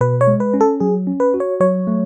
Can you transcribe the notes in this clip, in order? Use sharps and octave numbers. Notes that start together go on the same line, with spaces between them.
B2 B4
C#5
G#3
B4
C#4
A4
F#3 G#4
C#4
B4
F#4
C#5
F#3 C#5
A3